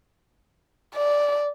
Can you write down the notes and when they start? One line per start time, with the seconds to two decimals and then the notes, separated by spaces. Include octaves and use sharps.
0.95 D5